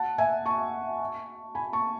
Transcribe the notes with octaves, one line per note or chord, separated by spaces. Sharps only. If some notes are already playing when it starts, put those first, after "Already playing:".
Already playing: F#5 A5
E5 G#5
A5 C#6
G#5 B5
A5 C#6